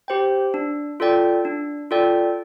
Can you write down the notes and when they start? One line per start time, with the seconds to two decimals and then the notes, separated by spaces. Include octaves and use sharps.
0.08 G4 C5 G5
0.54 D4
1.00 F4 A4 D5 G5
1.45 D4
1.91 F4 A4 D5 G5